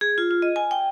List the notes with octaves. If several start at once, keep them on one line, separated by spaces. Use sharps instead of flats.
G#4
F4
F4
D#5
G#5
G5